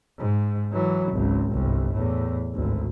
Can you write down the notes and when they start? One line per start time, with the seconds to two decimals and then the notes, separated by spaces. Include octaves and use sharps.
0.19 G#2
0.72 E3 F#3
1.12 G#1 C#2
1.51 G1 C2
1.93 E2 A2
2.55 G#1 D2